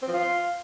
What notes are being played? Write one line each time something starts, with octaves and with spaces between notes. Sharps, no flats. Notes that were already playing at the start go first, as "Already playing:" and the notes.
C4
F3
F4